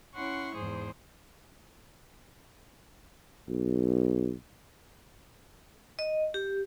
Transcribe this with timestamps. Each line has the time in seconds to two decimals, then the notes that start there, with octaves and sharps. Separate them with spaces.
0.15 C#4 E4 F#5 C6 C#6
0.55 E2 G#2 G#4 C5
3.48 B1
5.99 D#5
6.34 G4